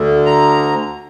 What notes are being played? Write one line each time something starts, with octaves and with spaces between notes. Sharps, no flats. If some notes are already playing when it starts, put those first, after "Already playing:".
Already playing: D2 D3
A#5